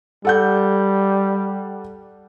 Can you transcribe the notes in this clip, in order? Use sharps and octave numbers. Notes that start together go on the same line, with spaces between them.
G3 A4 F#5 G6